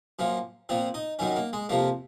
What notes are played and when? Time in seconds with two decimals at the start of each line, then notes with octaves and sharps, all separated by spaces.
0.19 F#2 F3 A#3
0.69 A#2 F3 C4
0.94 D#4
1.19 F#2 D#3 F#3 C#4
1.36 A#3
1.53 G#3
1.69 F2 C3 F3 A#3